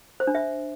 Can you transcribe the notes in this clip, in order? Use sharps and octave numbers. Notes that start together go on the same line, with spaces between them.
C5
D4
E5